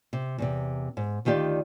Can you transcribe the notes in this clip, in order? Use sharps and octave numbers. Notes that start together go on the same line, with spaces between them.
C3
E2 A2 C3
G#2
D2 D#3 F4 G4 D5